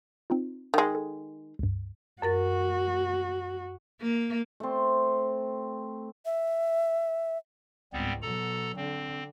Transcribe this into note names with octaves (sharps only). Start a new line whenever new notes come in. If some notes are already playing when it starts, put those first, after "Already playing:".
C4 D#4 F4
D#3 G#3
A4
C#2 G2
F#2 F#4 A#4 A6
A#3
A3 C4
E5
C#2 G#2 G3 B3 C4
B2 F#3 A4 A#5
D3 C4